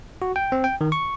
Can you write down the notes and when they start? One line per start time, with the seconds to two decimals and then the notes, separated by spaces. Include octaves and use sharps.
0.22 F#4
0.36 G5
0.52 C4
0.64 G5
0.81 D#3
0.92 C#6